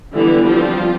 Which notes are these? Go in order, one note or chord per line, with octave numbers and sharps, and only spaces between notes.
D3 E3 G3 B3 E4
F3 G3 C4 F4